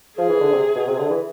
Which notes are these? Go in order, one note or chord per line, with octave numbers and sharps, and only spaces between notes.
F3 G#4
E3
D3
C3
B2
C3
D3
E3